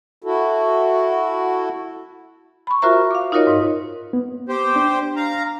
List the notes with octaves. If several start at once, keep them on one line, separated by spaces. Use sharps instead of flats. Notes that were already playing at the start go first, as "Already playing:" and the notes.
E4 F#4 A4
B5 C#6
F4 F#4 A#4 C5 E5 A#5
F5 D6
D#4 F4 F#4 A#4 C#5 D#5
G#2
B3
G4 C5
D4
F5 A#5